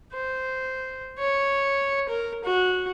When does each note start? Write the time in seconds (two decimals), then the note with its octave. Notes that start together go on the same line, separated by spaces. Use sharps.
0.13 C5
1.19 C#5
2.09 A#4
2.44 F#4